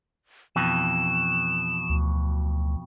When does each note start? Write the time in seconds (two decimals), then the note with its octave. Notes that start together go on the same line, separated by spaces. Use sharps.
0.56 F2 B2 E3 E7
1.89 D2